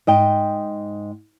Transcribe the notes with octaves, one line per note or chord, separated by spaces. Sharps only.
G#2 D#5 G5